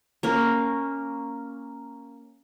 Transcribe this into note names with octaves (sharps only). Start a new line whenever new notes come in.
A#3 C#4 A#4